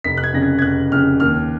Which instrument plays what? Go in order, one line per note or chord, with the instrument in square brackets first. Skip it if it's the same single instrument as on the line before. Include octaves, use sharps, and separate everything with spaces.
[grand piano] F1 B6
F#6
G#6
F2 C#3 A#6
G#6
G#6
F1 F#6
F2 C#3 F6
D#2 F6